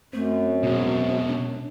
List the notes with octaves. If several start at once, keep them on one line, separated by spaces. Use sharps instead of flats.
F#2 A3 C4
B2 G#3 F#4
C#4 D4